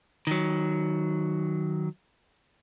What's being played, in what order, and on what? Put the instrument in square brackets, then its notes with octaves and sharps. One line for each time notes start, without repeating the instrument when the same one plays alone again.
[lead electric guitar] D#3 F#3